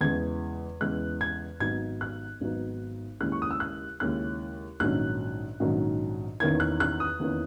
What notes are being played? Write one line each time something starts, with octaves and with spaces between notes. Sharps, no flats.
E2 C#3 E3 G#3 G#6
E2 C#3 E3 G#3 F#6
G#6
G#1 G#2 F#3 B3 D#4 G#6
F#6
G#1 G#2 F#3 B3 D#4
D#2 C#3 G#3 C#4 E4 F#6
C#6
D#6
E6
F#6
D#2 C#3 G#3 C#4 E4 F#6
A#1 G#2 D#3 F#3 C#4 F#6
A#1 G#2 D#3 F#3 C#4
E2 D#3 A#3 C#4 E4 G#6
F#6
F#6
D#6
E2 D#3 A#3 C#4 E4